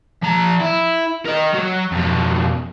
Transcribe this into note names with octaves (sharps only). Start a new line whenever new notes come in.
F3 A#5
E4
A#4 D#5
F#3
F2 B2